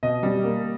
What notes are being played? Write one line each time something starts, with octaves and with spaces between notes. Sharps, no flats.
B2 D#5
G3
A#3